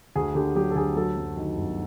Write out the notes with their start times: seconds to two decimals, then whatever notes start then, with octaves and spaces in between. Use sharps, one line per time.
0.16 D2 G#4
0.35 D3 G4
0.55 F#3 G4
0.71 A4
0.75 D2 G#4
0.96 F#3 A4
1.17 F#2
1.37 D#3
1.57 G1